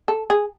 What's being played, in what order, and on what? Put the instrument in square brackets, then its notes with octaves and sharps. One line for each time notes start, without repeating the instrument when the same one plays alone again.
[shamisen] A4
G#4